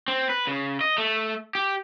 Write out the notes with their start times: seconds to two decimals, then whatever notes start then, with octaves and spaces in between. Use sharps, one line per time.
0.08 C4
0.30 B4
0.47 C#3
0.81 D#5
0.98 A3
1.55 G4